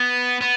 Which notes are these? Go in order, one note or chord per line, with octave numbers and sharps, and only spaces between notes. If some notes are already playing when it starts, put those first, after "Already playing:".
Already playing: B3
B3